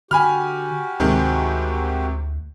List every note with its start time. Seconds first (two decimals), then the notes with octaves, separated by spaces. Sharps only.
0.11 D3 F#4 G4 G#5 B5 F6
1.00 D2 G#2 C3 D#3